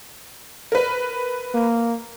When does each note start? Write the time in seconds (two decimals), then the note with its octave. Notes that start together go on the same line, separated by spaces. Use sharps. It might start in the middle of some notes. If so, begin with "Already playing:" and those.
0.72 A#4 B4
1.55 A#3